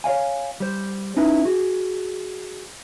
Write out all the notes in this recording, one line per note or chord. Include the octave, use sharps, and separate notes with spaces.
C#5 D5 F5 G#5
G3 C5
C#4 D#4 E4 B4
F#4 G#4